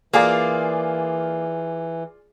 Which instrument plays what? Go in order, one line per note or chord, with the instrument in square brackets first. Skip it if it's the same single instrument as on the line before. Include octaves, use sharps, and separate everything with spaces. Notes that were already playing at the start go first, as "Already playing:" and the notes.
[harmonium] E3 [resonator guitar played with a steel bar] A#3 [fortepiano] F4 G#4 D5